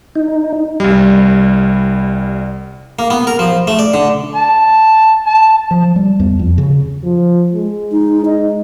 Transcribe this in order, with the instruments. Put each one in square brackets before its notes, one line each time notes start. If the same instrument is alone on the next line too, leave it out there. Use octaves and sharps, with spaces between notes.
[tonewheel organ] D#4
[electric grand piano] C2 G3
[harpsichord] A#3
B3
A#4
F3
A3
D5
D3
[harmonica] A5
A5
[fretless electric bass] F3
G3
E2
F2
C#3
[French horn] F3
G#3
[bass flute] D#4
D#5